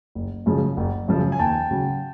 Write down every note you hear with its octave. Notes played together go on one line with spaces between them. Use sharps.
F#1
F#2 C#3 F3 G#3
F#1
F#2 C#3 F3 G#3
G#5
D#2 G5 A5
C#3 F#3